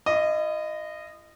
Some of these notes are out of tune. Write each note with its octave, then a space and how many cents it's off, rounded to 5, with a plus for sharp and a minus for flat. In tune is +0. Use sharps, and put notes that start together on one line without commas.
E4 +40 D#5 -15